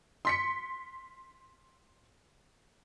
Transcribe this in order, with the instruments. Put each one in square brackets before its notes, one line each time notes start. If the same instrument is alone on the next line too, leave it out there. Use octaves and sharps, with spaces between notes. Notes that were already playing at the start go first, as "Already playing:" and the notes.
[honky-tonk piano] C6 B6 C#7